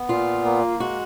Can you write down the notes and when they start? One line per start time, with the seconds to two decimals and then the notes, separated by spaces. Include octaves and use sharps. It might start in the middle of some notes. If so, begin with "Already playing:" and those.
Already playing: B3
0.09 A#2 F4
0.45 A#3
0.80 G#3 F#4